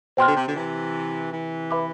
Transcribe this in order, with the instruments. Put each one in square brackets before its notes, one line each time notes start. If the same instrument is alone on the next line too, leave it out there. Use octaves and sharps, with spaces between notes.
[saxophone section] B2 [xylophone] C5 G5 C6 F6
[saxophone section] B2 D3
C3
B2 D3
C3 E3
C3 E3
[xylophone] B4 E5 B5 D6